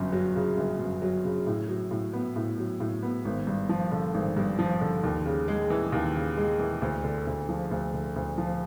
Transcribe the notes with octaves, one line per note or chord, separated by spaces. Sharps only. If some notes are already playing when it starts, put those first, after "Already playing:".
Already playing: G1 F#2
F#3
C#3
G1
F#2
F#3
C#3
A2
F#3
A2
B3
A2
F#3
A2
B3
G#1
G2
F3
D3
G#1
G2
F3
D3
D#2
C#3
G#3
E3
D#2
C#3
G#3
E3
D2
D3
D2
F3
D2
D3
D2
F3